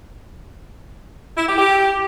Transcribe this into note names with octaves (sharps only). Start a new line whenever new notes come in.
E4
G4
G4